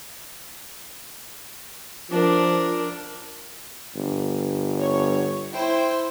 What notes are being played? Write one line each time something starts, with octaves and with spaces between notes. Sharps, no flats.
F3 D4 A#4
G1
C#5
E4 C5 G5